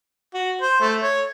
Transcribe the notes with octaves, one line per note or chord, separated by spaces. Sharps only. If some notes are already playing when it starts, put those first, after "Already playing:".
F#4
C5
A3
C#5